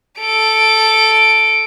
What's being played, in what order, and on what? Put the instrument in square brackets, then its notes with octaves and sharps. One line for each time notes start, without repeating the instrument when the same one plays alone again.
[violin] A4 D7